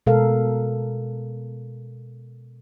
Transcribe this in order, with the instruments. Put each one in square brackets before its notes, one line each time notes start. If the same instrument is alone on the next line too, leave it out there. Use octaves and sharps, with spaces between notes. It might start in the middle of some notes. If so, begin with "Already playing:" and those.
[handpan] B2 G#3 A4 A#4 F5